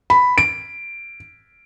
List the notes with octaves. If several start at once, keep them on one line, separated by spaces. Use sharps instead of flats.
B5
D7